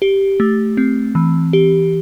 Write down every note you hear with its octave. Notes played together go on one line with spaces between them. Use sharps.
G4
A3
C4
E3
G4